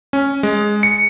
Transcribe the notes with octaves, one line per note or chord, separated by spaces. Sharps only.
C#4
G#3
C#7